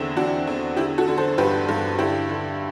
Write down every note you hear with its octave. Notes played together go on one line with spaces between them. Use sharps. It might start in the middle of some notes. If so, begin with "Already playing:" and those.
Already playing: E2 D3 C4 E4
E2 D4 F#4
E2
D3 E4 G4
F#4 A4
D3
A4 C5
G2 G4 B4
G2
D3 E4 G4
D3